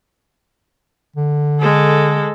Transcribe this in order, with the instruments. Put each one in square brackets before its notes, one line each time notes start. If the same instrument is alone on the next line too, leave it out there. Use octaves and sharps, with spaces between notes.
[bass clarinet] D3
[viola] G#3 A4